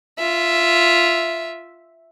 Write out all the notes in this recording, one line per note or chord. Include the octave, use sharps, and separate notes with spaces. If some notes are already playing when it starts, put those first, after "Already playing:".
F4 E5